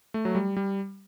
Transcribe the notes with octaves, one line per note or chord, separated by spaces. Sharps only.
A3
F#3
G3
G3